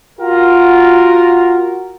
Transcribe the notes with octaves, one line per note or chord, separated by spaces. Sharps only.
F4 F#4 A#4